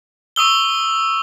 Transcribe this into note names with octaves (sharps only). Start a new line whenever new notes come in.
C#6 D#6 E6 G7